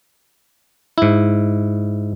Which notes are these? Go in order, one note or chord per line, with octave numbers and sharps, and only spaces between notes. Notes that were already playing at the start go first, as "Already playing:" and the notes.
G#2 E4